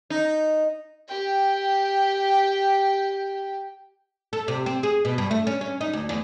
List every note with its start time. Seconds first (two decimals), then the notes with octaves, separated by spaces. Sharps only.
0.10 D#4
1.08 G4 G5
4.33 A4
4.48 C3
4.66 C4
4.83 G#4
5.05 B2
5.18 G2
5.31 A3
5.47 C#4
5.61 C#4
5.81 D#4
5.93 D2
6.09 E2